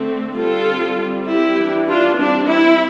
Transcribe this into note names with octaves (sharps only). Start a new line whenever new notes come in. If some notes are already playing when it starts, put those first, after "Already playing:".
Already playing: D3 A3 C4
D3 G3 C4 F4 A4
G3 C4
E4 G4
E3 G3 D4
D4 F4
G3 C4 D4
E4